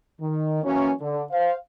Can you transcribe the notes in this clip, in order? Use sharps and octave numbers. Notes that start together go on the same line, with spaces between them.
D#3
E3 F#3 A#3 C#4
D3
C5 F5